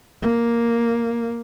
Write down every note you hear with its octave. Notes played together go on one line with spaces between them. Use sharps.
A#3